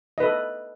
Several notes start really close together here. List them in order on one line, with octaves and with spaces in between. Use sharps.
D#5 B4 A4